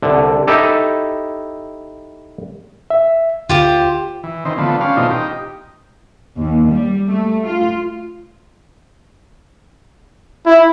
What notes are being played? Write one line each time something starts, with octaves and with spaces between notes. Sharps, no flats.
C2 D3
D#4 E4 G4 A4
E5
D2 F4 G4 C5
E3
D#3 E3 C4
D3 F3 A3 B3
G3 C#4 D4 F5
B2 E3 A3 C4 D#4 F4
D#4 G4
D#2
G3
A3
F4
E4